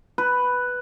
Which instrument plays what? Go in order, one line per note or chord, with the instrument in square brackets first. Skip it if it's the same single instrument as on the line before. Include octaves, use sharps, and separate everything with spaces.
[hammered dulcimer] B4